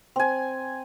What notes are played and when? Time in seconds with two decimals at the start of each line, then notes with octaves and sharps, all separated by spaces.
0.16 C4 G#5